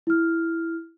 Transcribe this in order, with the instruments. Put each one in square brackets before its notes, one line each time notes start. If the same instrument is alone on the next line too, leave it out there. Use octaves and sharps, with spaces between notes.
[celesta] E4 F6